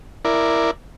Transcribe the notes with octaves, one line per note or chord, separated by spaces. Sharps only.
E4 A#4 D5